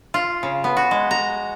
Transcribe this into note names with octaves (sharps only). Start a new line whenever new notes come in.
F4
C#3
B3
F#4
G#3
A#5